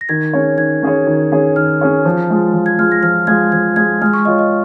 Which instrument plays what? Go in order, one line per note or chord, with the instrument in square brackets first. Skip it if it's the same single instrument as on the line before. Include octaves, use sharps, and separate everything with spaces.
[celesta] A#6
[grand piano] D#3 [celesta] G#6
[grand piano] C#4 G#4 C#5
[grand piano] D#3 [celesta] G#6
[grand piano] C#4 G#4 C#5
D#3
C#4 G#4 C#5
[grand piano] D#3 [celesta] F6
[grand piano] C#4 G#4 C#5
F3
G#3 F4
F3
[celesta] G#6
[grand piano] G#3 F4 [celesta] F6
[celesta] A#6
[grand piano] F3 [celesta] F6
[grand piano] G#3 F4 [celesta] G#6
[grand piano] F3 [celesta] G#6
[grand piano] G#3 F4 [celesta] G#6
[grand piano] G#3 [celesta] F6
[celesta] C#6
[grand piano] F4 C#5 [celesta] D#5
[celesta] D#5